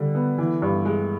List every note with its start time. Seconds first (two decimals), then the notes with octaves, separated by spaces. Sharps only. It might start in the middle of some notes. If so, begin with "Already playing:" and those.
Already playing: D3 G3
0.15 B3
0.38 E3
0.62 G2
0.85 G#3